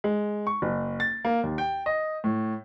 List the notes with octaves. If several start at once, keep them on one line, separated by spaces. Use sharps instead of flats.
G#3
C#6
F#1
A6
A#3
D#2
G5
D#5
A2